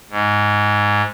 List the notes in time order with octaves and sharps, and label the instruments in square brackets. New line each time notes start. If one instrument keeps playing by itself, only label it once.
[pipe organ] G#2